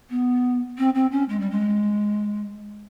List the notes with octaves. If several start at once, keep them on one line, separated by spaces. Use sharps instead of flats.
B3
C4
C4
C#4
G#3
G3
G#3